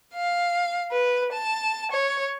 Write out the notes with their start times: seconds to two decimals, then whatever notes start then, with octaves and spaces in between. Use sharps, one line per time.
0.14 F5
0.91 B4
1.33 A5
1.92 C#5